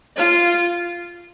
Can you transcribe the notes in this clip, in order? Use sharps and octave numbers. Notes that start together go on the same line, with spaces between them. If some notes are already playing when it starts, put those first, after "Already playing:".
F4